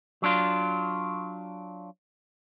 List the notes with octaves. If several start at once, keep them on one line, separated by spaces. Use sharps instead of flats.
F#3 D4 F4